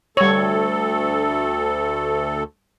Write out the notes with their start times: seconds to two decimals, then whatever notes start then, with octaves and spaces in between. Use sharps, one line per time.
0.17 D2 G3 A4 C#5